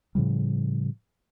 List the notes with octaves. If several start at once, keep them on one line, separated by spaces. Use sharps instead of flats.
A2 C#3 F3 G3